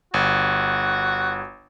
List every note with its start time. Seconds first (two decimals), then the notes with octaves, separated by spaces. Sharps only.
0.14 G1 F#4